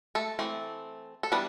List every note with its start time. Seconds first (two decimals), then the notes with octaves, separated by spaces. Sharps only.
0.15 A3 A4
0.39 E3 A3 C4
1.23 A4
1.32 E3 G3 B3 D4 B4